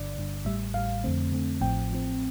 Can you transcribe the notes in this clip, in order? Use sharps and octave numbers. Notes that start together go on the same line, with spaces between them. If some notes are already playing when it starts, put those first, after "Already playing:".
Already playing: G1 G2 D3 D5
G1 G2 D3
A1 A2 G3 E5
A1 A2 G3 F5
F2 D3 A3 C4
F2 D3 A3 C4
A1 A2 F3 C4 G5
A1 A2 F3 C4